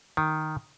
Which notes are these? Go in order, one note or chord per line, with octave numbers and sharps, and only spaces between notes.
D#3